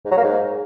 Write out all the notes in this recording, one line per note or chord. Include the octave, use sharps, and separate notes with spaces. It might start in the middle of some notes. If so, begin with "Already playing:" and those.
G#2
F#3
A#3
G#2